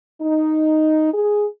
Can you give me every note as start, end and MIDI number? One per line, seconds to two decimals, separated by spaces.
0.21 1.10 63
1.13 1.46 68